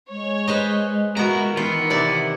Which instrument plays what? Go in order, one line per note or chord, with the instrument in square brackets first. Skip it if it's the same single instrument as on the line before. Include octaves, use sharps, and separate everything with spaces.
[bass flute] G#3 [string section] C#5
[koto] B4 C5 D#5
[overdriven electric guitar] A#2 E4 [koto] B3 A#5 [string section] F#4 A#4
[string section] D#3 E3 [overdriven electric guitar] B3 [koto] F4
[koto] C3 E4 D5